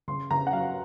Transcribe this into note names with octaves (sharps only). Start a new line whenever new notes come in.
C#3 C6
C#3 A#5
F#5
F#3 F5